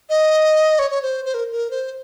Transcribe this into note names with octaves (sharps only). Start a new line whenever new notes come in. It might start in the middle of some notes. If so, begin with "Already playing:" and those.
D#5
C#5
C#5
C5
C5
A#4
A#4
C5